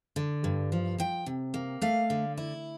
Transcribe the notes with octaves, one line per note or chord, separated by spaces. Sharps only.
D3
G2
F3
F3 G5
C3
A#3
A3 F5
D3
E4